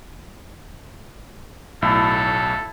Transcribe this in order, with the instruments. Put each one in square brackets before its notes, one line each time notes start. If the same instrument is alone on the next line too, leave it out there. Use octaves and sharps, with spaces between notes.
[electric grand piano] B1 A2 [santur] E4 A5 [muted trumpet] A4